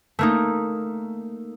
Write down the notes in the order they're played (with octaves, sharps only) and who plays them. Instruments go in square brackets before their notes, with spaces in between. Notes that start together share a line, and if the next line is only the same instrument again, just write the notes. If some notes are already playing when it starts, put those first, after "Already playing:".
[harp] A3 A#3 D#4